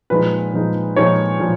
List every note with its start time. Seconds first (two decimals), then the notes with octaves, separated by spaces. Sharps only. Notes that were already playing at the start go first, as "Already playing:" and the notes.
0.10 A#2 F3 G#3 D#4 B4
0.53 A#2 F3 G#3 D#4
0.96 A#2 F3 G#3 D#4 C#5
1.40 A#2 F3